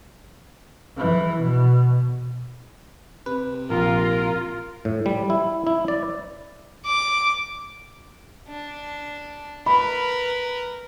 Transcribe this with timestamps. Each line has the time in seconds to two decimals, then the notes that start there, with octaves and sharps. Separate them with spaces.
0.98 E3
1.42 B2
3.26 C3 B4
3.70 A#1 F4 A#4
4.85 A2
5.06 G3
5.30 E4
5.67 E4
5.88 D5
6.86 D6
8.48 D4
9.66 A#4 B4 B5